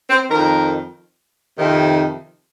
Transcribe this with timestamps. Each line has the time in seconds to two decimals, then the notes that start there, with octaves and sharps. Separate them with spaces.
0.10 C4
0.30 F2 D#3 A#4
1.58 F2 C3 D#3